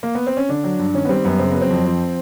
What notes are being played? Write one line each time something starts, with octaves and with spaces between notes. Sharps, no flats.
A#3
B3
C4
C#4
D3 D4
F#3
G2
D#3 C#4
B3
G3 C4
F#2 B3
C#3 C4
F#3 B3
C4
F2
F3